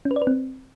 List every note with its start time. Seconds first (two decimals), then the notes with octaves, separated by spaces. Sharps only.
0.05 C#4
0.11 B4
0.16 D5
0.22 B4
0.27 C4